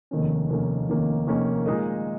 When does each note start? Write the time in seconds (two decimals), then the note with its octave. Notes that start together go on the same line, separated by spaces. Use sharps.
0.11 F1 D#2 D#3 A#3 C#4
0.50 F1 D#2 D#3 A#3 C#4
0.89 F1 D#2 D#3 A#3 C#4
1.27 F1 D#2 D#3 A#3 C#4
1.66 A#2 G#3 D#4 A#4 D#5